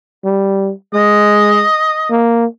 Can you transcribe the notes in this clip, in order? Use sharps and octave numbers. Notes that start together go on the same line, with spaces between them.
G3
G#3 D#5
A#3